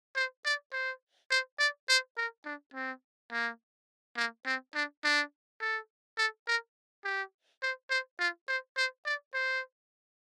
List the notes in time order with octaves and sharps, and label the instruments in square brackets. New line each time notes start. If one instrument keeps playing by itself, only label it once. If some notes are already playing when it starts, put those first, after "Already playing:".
[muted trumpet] C5
D5
C5
C5
D5
C5
A#4
D4
C4
A#3
A#3
C4
D4
D4
A4
A4
A#4
G4
C5
C5
F4
C5
C5
D5
C5